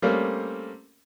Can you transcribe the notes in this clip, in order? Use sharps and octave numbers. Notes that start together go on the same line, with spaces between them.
G3 A3 A#3 C4 C#4 A#4